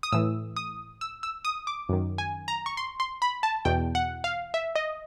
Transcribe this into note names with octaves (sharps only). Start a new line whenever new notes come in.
D#6
A2 E3 E6
D#6
E6
E6
D#6
D6
F#2 D#3
G#5
A#5
C#6
C6
C6
B5
A5
E2 B2 G5
F#5
F5
E5
D#5